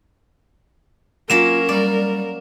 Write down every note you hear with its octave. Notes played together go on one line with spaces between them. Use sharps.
F#3 A#3 C#4 F4 A#4 E7
G3 D5